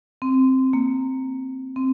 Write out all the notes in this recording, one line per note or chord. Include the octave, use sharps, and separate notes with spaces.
C4
A#3
C4